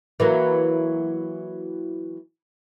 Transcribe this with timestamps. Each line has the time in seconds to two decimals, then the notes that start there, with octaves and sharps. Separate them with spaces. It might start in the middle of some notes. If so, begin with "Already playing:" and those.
0.20 E3 F#3 A#3